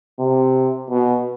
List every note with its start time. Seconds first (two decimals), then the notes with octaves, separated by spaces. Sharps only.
0.19 C3
0.90 B2